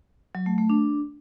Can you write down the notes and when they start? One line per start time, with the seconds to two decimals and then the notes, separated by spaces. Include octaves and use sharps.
0.35 F#3
0.46 A3
0.58 A3
0.70 D4